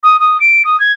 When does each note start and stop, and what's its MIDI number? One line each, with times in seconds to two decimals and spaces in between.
0.03 0.19 87
0.20 0.37 87
0.40 0.62 98
0.64 0.79 87
0.79 0.92 92